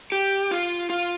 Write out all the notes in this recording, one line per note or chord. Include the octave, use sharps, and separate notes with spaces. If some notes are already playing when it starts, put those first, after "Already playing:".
G4
F4
F4